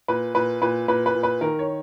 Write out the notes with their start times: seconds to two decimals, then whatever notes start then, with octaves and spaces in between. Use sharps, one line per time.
0.08 A#2 B4
0.35 A#2 B4
0.62 A#2 B4
0.88 A#2 B4
1.06 B4
1.15 A#2
1.23 B4
1.41 D#3 A#4
1.59 C#5